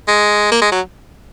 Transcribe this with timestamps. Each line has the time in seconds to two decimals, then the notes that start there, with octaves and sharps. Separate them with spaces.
0.08 G#3
0.52 A#3
0.62 G#3
0.72 F#3